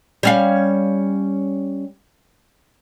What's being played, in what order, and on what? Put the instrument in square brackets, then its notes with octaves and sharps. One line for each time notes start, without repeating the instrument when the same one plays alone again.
[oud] G3 C#4 F5